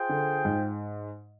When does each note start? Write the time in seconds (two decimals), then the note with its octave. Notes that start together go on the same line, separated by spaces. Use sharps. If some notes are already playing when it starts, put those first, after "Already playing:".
Already playing: F4 G#4 C5 G5
0.09 D3
0.45 G#2